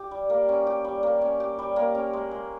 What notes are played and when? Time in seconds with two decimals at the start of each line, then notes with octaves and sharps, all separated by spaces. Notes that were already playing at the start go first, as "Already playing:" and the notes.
Already playing: G4
0.11 G3
0.30 A#3
0.49 C#4
0.67 G4
0.85 G3
1.03 A#3
1.21 C#4
1.40 G4
1.59 G3
1.76 A#3
1.95 C#4
2.13 G#3
2.31 G#3